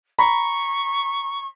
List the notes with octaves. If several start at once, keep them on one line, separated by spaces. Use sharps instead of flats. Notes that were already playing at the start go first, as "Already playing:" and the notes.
A#5 B5 C#6